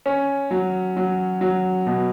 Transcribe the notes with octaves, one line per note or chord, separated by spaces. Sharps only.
C#4
F#3
F#3
F#3
B2